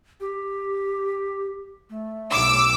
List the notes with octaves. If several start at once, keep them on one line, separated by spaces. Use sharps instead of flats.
G4
A3
B1 D6 E6